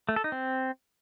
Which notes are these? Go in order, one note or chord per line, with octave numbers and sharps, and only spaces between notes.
A3
A4
D#4
C4